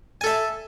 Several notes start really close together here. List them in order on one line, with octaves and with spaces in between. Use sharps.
G#5 A4 E5